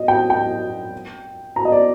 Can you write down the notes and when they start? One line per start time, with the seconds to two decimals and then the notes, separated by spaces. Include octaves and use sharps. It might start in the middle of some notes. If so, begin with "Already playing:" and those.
Already playing: D#5
0.08 G5
0.30 G5
1.56 A#5
1.65 D#5
1.72 D5